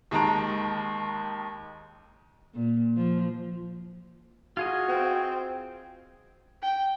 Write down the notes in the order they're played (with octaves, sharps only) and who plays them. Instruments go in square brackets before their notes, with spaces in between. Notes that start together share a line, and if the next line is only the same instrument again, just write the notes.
[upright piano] D#2 D#3 G#3 A5 A#5 D7
[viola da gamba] A#2
F3
[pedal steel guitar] F4 G#4 D#5 [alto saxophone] F#4
[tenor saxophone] C4
[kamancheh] G5